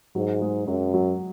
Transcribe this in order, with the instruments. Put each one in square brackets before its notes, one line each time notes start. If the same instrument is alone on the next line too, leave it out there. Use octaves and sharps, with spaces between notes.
[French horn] G#2 [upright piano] F#3
[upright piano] G#3
[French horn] F#2 [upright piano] F#3
[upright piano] F#3